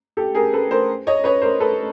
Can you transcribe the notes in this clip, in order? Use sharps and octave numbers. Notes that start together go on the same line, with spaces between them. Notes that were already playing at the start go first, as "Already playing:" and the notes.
G4 A4
G#4 A#4
A4 B4
A#4 C5
C#5 D#5
B4 C#5
A#4 C5
A4 B4